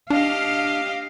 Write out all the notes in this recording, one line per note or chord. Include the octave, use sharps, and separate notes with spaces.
D4 G4 D#5 F5